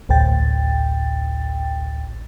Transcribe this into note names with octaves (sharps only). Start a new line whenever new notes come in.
A1 D2 A2 G5 A6